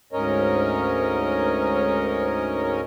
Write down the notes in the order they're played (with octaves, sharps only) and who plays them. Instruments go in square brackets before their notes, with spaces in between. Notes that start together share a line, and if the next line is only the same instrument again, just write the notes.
[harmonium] D2 G#2 C#4 A#4 C#5 D#5